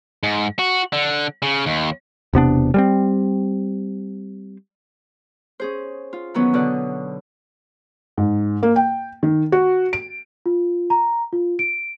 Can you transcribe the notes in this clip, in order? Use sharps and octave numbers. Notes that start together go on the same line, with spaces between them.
G#2
F#4
D3
C#3
D#2
E1 C3 B3 D4
G3 G#3 C4
C#4 G#4 C5
F4
D#3 E3 F#3 B3 C#4
B2 D3 D5 D#6 F#6
G#2
A#3
G5
D#3
F#4
D7
F4
A#5
F4
D7